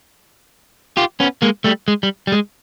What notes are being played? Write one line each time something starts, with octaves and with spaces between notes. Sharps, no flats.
F4 G4
B3 C#4
G#3 A#3
G3 A3
G#3
G3
G3
G#3